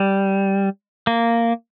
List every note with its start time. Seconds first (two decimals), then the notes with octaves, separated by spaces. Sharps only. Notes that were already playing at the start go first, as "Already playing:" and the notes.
Already playing: G3
1.07 A#3